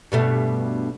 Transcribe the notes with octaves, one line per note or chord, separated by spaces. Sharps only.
G2 B2 A3